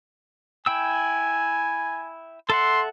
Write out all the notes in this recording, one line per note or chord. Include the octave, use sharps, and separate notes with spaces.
E4 G5 G#5 E6
A4 E5 F#5 C6